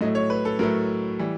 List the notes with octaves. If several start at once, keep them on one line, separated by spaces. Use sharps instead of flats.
A2 F#3 A3 D#5
C#5
B4
A4
A2 F#3 A3 A#4
E3 G3